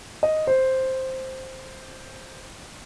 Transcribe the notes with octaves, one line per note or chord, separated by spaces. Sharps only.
D#5
C5